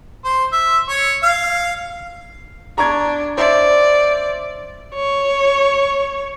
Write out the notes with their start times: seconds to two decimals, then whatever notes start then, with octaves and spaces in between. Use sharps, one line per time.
0.25 C5
0.52 E5
0.89 C#5
1.23 F5
2.78 D4 A#5 C#6 G#6
3.38 C5 D5 E5
4.95 C#5